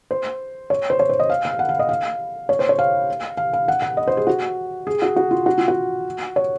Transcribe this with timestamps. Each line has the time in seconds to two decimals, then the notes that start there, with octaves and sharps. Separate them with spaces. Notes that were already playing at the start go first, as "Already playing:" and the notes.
0.11 C5
0.70 C#5
0.90 C5
1.00 C#5
1.09 C5
1.20 D#5
1.30 F5
1.45 F5
1.59 F#5
1.69 F5
1.79 D#5
1.89 F5
2.49 C#5
2.59 C5
2.69 C#5
2.79 F5
3.37 F5
3.53 F5
3.68 F#5
3.82 F#5
3.97 D#5
4.08 C5
4.17 G#4
4.27 F#4
4.87 G#4
5.02 F#4
5.16 F#4
5.31 F4
5.46 F#4
5.58 F4
5.68 F#4
6.36 C#5